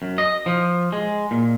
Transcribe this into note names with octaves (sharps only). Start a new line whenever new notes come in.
F#2
D#5
F3
G#3
A#2